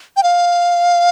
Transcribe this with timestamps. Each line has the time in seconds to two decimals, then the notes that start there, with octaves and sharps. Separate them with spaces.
0.17 G5
0.23 F5